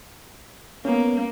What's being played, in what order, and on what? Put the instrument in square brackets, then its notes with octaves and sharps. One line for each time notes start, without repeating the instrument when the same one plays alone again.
[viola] A#3 [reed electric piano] B3 C#4